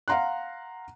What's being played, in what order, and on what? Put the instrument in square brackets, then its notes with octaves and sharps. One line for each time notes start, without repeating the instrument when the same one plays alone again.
[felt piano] F5 F#5 A#5 C6 F#6